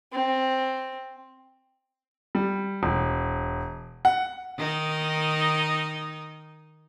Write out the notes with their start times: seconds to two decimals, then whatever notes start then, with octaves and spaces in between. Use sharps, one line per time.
0.13 C4
2.35 G3
2.83 E1
4.05 F#5
4.57 D#3 D#4